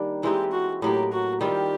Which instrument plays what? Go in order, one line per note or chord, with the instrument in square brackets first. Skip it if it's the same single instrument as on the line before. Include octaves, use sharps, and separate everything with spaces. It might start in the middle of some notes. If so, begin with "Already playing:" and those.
Already playing: [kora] D#3 G3 A#3 D4
[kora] E3 G#3 C4 D#4 [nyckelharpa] G4
[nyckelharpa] F#4
[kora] A2 F#3 A#3 [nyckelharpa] G4
[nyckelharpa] F#4
[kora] D#3 G3 C4 F4 [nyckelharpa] G4